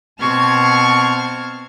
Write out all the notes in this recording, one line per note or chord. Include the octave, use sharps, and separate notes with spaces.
B2 C4 A5 C#6 F6 G#6